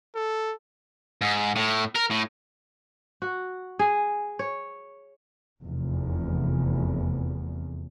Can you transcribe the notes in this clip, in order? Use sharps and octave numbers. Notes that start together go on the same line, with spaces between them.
A4
G#2
A2
A#4
A2
F#4
G#4
C#5
F1 E2